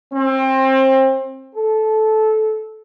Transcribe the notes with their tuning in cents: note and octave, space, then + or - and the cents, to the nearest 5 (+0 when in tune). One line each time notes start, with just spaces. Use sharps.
C4 +25
A4 -15